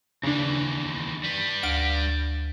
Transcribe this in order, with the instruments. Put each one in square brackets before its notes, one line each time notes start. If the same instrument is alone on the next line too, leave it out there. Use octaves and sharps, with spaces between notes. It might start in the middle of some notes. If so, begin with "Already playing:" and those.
[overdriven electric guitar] D#2 E3 [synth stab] C#3 D4
[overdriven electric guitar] G3 B4
[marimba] D2 [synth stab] F5 D7